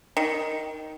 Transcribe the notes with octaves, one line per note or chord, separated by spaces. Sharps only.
D#3